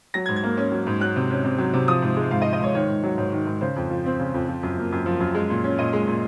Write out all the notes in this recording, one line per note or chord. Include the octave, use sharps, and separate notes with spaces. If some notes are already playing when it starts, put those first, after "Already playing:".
F#3 A#6
G#6
G#2
G#6
A#3
C#4
F#3
G#2
F#3 F#6
C3
C#4
C3
F#3
C3
F3 D#6
G#2
G#3
G#2 F5
D#5
F3
D#5
G#2 C#5
D#3 C#5
G#2
F#3
G#2 C#5
D#3
G#2
C#3 C5
F2
F3
C4
C#3
F2
F3
F#2
A#3
F#2
F3
F#2
G#3
A#2
C#4
A#2 D#5
G#3
A#2